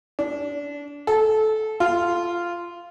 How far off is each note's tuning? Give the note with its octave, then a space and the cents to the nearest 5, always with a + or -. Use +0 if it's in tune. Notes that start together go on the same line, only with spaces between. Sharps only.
D4 -25
A4 -20
F4 -10